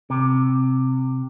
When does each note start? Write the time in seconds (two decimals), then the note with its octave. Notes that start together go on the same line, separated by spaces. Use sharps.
0.10 C3